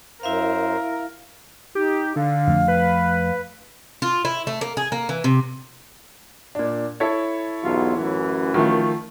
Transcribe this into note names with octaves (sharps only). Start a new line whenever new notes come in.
F#2 E4 A#4 C5 E5 F5
D#4 G4
D3 F5
F2 F3 A3
B4
F4
E4
A3
A#3
G#4
A#3
E3
C3
A#2 D4
E4 A4 C#5
B1 E2 F4
A1 F#2 E3
D#3 F3 A3